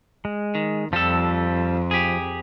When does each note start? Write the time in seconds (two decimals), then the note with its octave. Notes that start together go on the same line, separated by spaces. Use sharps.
0.25 G#3
0.55 D#3
0.93 F2 F3 G3 A4 E6
1.91 G4 G#4